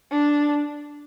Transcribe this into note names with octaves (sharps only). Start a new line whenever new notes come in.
D4